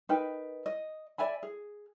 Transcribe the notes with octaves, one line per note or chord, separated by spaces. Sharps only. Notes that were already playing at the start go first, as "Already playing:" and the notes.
D#4 A#4 B4 G5
D#5
D5 E5 G#5 B5
G#4